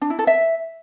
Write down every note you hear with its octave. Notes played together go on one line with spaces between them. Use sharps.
D4
E4
A4
E5